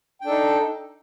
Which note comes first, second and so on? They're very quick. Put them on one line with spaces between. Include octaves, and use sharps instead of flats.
G5 D4 A4 D#4